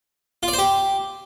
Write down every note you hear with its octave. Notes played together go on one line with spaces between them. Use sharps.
F4
D5
C5
G4